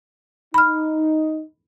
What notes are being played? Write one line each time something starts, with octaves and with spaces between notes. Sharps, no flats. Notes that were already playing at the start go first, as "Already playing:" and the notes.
D#4 B5 F6